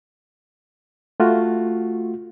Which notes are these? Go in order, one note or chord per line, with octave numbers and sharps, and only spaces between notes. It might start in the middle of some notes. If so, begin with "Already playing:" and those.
A3 F4 F#4